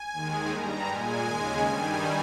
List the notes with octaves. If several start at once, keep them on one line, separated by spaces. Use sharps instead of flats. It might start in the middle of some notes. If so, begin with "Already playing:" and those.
Already playing: G#5
D#2 D#3 G#3
G2 G3 A#5
A#2 G#3 G#5
D#2 C#3 G#3
G2 D#3 G3